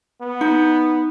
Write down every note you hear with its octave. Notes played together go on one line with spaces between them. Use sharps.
B3
D#4